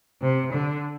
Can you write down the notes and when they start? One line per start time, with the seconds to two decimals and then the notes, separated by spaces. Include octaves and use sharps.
0.22 C3
0.53 D3